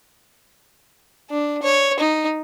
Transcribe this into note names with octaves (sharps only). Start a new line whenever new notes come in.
D4
C#5
D#4